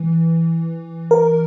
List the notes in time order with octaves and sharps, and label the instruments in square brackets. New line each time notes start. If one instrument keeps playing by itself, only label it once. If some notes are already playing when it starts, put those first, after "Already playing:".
Already playing: [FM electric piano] E3
A#4